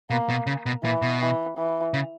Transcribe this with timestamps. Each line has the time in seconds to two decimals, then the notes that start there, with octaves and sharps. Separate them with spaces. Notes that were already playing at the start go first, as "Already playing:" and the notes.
0.10 B2 A#3
0.29 B2
0.47 C#3
0.66 B2
0.84 A#2 E3
1.02 B2
1.21 E3
1.57 E3
1.94 C#3